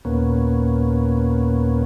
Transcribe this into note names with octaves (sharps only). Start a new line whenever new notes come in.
D#2 A#2 A#3 B3 C#4